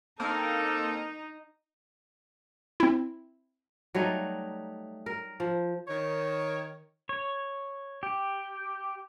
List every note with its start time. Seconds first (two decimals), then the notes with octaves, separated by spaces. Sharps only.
0.20 A#3 C4 D#4 A4 A#4
2.80 C4 E4
3.95 F#3 G3 A3 D#4
5.06 A#4
5.40 F3
5.88 D#3 C#5
7.09 C#5
8.03 G4